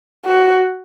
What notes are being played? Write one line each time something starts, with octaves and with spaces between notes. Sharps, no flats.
F#4